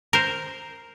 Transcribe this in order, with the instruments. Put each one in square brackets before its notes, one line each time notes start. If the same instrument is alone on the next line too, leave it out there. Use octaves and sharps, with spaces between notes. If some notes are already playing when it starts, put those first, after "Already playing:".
[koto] A#4 C5